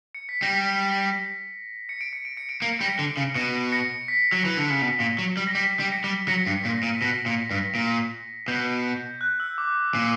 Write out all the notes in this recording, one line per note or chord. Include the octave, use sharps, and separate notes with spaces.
C#7
B6
G3 A#6
C#7
D7
C#7
D7
C#7
D7
A#3 C#7
D7
G3
A#6 C#7
D3
C#3
B2 A#6 C#7
A#6 C#7
B6
F#3
E3
D3
C#3
B2
A#2
F#3
G3
A#6
G3 B6
G3
A#6 C#7
G3
F#3 A#6 C#7
G2
B6
A#2
A#6
A#2
B6
B2 A#6
A#2
G2
A#2
B2 G6
F#6
E6
D6
A#2